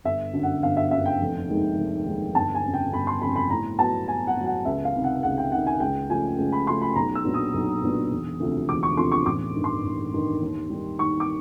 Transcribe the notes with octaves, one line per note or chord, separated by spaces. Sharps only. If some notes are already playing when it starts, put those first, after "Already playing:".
G1 E5
F#2 D3
F#5
G1 F5
E5
F#2 D3 E5
G5
F1
D#2 D#3 G#3
F1
D#2 D#3 G#3
G1 A5
G#5
F2 C#3
G5
G1 B5
C6
F2 C#3 B5
B5
A2 A#5
F#3 B3 A5
A2 G#5
F#5
F#3 B3
F#5
C#2 E5
F5
C3 D#3
F#5
C#2 F#5
G5
C3 D#3 F#5
G#5
C#2 G5
C#3 F3 A3 C#4 G#5
C#2
B5
C#3 F3 A3 C#4 C6
B5
B1 A#5
E6
A#2 F#3 B3 D4
D#6
B1
A#2 F#3 B3 D4
E1
D2 C3 F3
E1 D6
C#6
D2 C3 F3 C6
C#6
A1 D6
G2 D#3
C6
A1
G2 D#3
D#2
D#3 G3
D#2 C#6
D6